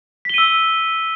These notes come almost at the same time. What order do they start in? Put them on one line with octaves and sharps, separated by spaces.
B6 G7 D#7 E6